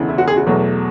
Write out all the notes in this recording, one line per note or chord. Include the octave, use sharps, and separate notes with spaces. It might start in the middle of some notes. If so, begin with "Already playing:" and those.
Already playing: E1 D2 C#3 E3
E4
F#4
G#4
F#4
E2 B2 F#3 A3